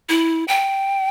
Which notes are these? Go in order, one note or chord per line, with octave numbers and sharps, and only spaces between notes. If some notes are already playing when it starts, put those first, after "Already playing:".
E4
G5